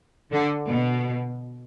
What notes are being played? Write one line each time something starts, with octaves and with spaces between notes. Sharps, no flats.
D3
B2